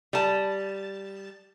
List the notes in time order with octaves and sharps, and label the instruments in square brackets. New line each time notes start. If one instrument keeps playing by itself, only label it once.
[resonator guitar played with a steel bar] G3 A5